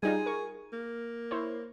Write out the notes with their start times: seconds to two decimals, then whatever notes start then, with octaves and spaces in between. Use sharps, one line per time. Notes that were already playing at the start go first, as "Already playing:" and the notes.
0.03 G3 D#4 F4 G#4
0.26 A#4 C#6
0.73 A#3
1.31 E4 C5 C#5